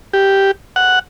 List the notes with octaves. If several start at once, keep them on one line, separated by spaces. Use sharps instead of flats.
G4
F#5